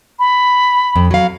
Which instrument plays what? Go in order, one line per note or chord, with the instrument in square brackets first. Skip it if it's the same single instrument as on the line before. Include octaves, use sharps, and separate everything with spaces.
[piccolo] B5
[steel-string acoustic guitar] F2
F#3 F5